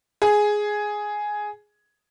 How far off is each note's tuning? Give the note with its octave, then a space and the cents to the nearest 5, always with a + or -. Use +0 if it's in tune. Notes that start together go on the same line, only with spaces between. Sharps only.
G#4 +5